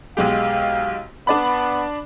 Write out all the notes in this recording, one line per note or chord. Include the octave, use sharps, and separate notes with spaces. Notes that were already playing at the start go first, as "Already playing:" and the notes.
B1 G#3 G4 F5
B3 D4 D5 B5